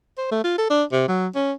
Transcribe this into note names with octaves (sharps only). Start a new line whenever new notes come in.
C5
A3
F4
A4
D4
C3
F#3
C#4